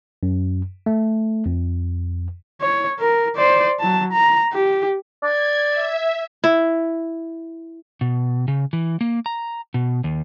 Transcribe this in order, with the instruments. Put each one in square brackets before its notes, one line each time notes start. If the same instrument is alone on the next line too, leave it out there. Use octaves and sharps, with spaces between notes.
[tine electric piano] F#2
A3
F2
[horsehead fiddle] C#5
A#4
C5 D5
F#3 A5
A#5
G4
[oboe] D5 [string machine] G#6
[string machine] E5
[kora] E4
[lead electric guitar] B2
C#3
E3
A#3
A#5
B2
D#2